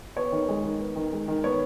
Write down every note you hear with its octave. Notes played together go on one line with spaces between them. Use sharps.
B3 C#5
D#3
G#3
D#3
B3
D#3
G#3
D#3
B3 C#5